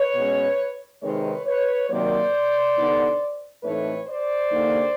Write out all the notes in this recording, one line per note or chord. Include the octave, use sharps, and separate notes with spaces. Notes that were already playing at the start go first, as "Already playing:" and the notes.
Already playing: B4 C#5
B2 G#3 C#4
C3 D#3 G#3 C4 D#4 B4 C#5
B4 C#5
C3 D#3 F#3 A#3 C5 D5
D3 G3 B3 D#4
A2 E3 A3 C4 D#4 B4 C#5
C5 D5
D3 G3 A#3 D#4